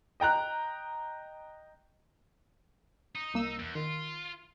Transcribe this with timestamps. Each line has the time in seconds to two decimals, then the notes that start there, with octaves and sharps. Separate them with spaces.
0.20 D#5 G5 A#5 F#6
3.15 D#4 D#6
3.34 C2 A#3 E6
3.59 E2
3.75 D#3 F4